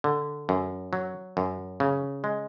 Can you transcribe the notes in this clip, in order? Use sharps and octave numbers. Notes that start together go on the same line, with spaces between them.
D3
F#2
F#3
F#2
C#3
G#3